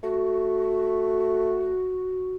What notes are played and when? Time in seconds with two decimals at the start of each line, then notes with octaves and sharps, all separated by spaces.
0.03 A3 F#4